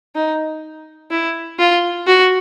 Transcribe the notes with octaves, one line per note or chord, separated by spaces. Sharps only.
D#4
E4
F4
F#4